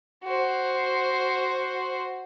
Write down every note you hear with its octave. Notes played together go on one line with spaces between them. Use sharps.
F#4 C5